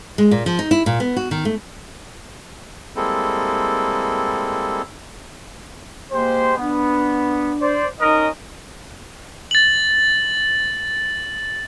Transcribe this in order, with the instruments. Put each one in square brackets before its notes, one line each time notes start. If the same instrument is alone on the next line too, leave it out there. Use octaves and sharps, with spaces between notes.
[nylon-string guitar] G#3
A#2
F3
D#4
E4
A#2
B3
F#4
D#3
A3
[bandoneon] G3 G#3 A#3 C4 E4 A4
[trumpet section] G#3 G4 C5 [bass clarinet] A#3
[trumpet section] B3 [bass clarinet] D4
[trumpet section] C5 D5
[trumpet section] C#4 A#4 D#5 [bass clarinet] D#4
[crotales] A6 F#7